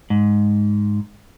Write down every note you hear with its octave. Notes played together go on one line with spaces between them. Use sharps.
G#2